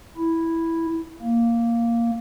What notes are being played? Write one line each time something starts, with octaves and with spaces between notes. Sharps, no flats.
E4
A#3